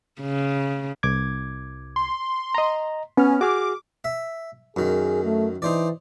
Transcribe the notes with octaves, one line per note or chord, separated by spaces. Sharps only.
C#3
C2 D6 G#6
C6
D#5 A#5
B3 C#4 F6
F#4 G#4 D6 F6
E5
F#2 D#3 G#4
A3
E3 D#4 C5 D5